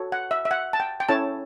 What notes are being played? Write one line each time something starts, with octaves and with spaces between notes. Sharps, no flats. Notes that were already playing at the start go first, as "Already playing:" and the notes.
Already playing: F#4 A4 C#5
F#5
E5
E5
F#5
A5
G5
G5
C#4 E4 A4 C#5 A5